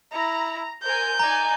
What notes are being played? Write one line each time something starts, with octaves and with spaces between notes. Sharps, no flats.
E4 A#5
A#4 C5 G#5 G6
D#4 D5 G#5 A#5